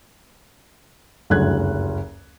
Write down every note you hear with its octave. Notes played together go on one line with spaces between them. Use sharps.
F#1 D2 G2 F#3 F#6 G#6